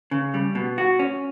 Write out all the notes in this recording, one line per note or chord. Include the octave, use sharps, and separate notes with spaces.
C#3
G3
B2
F#4
C#4